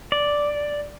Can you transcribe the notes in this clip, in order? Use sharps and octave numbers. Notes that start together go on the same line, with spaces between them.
D5